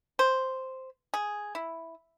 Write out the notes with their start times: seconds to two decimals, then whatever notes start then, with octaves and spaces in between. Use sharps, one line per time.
0.19 C5
1.14 G#4
1.55 E4